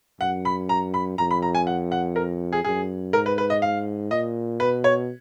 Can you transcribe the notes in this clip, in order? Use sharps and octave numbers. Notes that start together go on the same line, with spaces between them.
F#2 F#5
B5
A#5
B5
F2 A#5
B5
A#5
G#5
F#5
F#5
A#4
G#4
F#2 G#4
G#2 A#4
B4
B4
D#5
F5
A#2 D#5
B2 B4
C#5